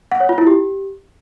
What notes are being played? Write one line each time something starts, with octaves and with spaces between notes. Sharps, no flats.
F#5
C#5
F4
E4
G4